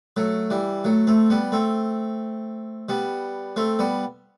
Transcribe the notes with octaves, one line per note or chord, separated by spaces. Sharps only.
F#3 A3
E3 G3
F#3 A3
A3 C4
G3 B3
A3 C4
G3 B3
A3 C4
G3 B3